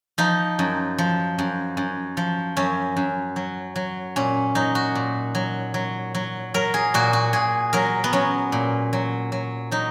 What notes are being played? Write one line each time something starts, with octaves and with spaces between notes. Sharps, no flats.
F3 D#4
F#2
F3
F#2
F#2
F3
F#2 C#4
F#2
F#3
F#3
A#2 C#4
F#3 D#4
F#4
A#2
F#3
F#3
F#3
F#3 A#4
G#4
A#2 F#4
F#4
A#2 G#4
F#3 A#4
B3
F#3 C#4
A#2
F#3
F#3
F#3 D#4